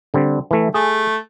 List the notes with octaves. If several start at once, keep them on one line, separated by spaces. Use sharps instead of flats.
D3 G3 C4
E3 A3
A3 G#4